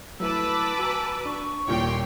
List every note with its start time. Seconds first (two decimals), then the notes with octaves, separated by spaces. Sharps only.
0.20 F#3 A3 E4 B4 A5 D6 E6
0.79 F#4 G#5 A#5 E6
1.26 D4 C#6
1.68 D#1 A#2 C#5 G5 C6